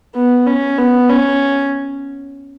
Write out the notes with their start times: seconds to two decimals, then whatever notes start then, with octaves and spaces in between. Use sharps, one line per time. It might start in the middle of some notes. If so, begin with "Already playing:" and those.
0.15 B3
0.46 C#4
0.78 B3
1.09 C#4